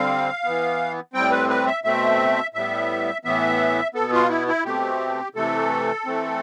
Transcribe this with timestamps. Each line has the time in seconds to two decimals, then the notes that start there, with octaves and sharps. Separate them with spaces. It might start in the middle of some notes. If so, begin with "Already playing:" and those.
Already playing: D3 G3 C4 F5
0.44 E3 B3
1.13 A2 G3 C4 G5
1.31 B4
1.49 B4
1.66 E5
1.84 B2 A3 C4 E5
2.54 A2 G3 B3 E5
3.25 A2 E3 B3 E5
3.94 B2 B3 A4
4.13 F4
4.29 E4
4.48 E4
4.65 B2 A3 C4 G4
5.35 C3 E3 A3 A4
6.06 E3 A3 C4